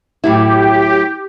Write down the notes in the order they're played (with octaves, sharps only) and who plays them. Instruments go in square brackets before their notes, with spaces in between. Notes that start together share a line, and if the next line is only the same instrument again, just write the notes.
[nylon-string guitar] A2 F#3 E4 [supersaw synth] G4